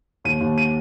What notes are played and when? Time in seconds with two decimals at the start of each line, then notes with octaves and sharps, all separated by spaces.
0.24 D#2 D#7
0.40 D#2
0.58 D#7